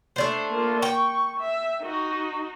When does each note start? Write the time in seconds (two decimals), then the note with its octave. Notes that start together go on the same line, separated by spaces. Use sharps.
0.16 A3 D4 C5
0.50 A#3 F4
0.82 G5 C#6
1.40 E5
1.82 D#4 F#4